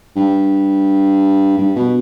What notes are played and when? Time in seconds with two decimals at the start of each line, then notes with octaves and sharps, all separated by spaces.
0.16 G2
1.58 G2
1.76 B2